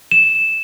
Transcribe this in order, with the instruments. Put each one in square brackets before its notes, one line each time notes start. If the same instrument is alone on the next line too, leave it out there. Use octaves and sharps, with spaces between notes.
[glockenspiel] E7